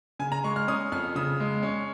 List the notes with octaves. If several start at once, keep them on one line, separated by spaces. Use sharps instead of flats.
C#3 G#5
A#5
G#3 C#6
F6
C#4 D#6
F2 F6
C#3 D#6
G#3
C#4